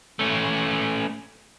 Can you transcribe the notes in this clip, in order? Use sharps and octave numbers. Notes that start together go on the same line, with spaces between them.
A3 C#4